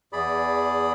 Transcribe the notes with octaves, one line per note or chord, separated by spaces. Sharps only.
E2 G#4 D5 B5